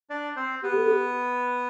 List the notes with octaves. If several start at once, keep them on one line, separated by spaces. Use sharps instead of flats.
D4 D5
C4 C5
B3 G4 B4
A4
G4